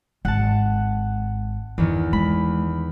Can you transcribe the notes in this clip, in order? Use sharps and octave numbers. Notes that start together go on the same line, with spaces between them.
G#1 F#5 A5
E2 G2 D#3
G#3 B5